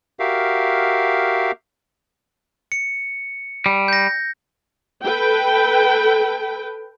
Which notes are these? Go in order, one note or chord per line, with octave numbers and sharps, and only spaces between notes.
F#4 G4 A#4 E5 F5
C#7
G3
G6 A#6
A4 B4 G5